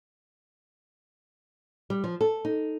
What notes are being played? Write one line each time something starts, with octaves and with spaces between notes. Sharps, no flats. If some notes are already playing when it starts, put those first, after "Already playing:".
G3
F3
A4
D#4